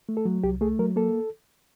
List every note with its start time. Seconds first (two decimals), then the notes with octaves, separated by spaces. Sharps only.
0.09 A3
0.17 A4
0.25 F#3
0.44 C2 G4
0.61 A3 G#4
0.79 F#3 A#4
0.96 A#3 A4